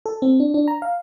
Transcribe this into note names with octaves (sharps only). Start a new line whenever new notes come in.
A4
C4
D4
D4
A#5
F5